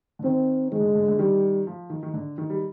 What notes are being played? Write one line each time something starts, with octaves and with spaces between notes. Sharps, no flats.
D3
D#3 C4
D#3 G#3
D3
D3
D3
D#3 G3
F3
D#3
D#3
D3
D#3
G3